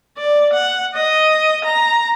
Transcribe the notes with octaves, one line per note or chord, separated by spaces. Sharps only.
D5
F#5
D#5
A#5